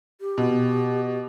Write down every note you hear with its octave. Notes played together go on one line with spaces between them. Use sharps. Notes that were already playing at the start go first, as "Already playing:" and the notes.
G4
B2